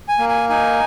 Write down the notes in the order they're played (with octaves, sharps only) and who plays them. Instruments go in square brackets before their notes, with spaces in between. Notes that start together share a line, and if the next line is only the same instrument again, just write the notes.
[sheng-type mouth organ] G#5
A#3
G#5
D#4 G#5